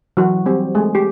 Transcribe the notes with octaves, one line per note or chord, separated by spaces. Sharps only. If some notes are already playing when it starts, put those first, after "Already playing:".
E3 F#3 F#4
G3 C4 G4
G#3 A3 G#4
G4